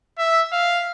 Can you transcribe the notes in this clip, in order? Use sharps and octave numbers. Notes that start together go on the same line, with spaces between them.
E5
F5